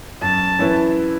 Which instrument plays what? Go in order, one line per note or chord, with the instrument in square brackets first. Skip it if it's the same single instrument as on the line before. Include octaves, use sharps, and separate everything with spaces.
[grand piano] F#2 [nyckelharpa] A5
[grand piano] E3 C#4 E4 B4